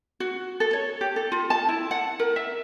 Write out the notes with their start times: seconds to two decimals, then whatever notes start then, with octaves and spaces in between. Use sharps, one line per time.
0.20 F#4
0.60 A4
0.73 C#5
1.01 G4
1.16 A4
1.32 F4
1.50 A5
1.68 E4
1.91 F#5
2.20 A#4
2.36 E5